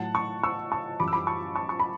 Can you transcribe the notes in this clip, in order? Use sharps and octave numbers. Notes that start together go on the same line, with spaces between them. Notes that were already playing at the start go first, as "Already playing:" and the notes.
Already playing: A2 F#3 F#5 A5
A5 C#6
C#6 E6
A5 C#6
F#2 E3 G3 B5 D6
E6
B5 D6
A5 C#6
A5 C#6
C#6
B5